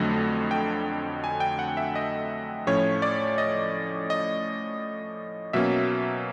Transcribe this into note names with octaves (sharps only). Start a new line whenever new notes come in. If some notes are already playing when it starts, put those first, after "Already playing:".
Already playing: F2 D3 F#3 A3 D#5
G5
G#5
G5
F#5
E5
D#5
A2 F3 A3 C#4 C#5
D5
D#5
D#5
B2 F#3 A#3 C#4 E5